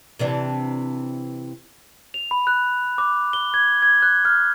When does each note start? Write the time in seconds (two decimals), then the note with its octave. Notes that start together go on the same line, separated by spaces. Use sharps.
0.19 C3 E3 D4
2.14 F7
2.31 B5
2.47 F#6
2.98 D6
3.33 G7
3.54 G#6
3.82 G#6
4.02 F#6
4.25 F6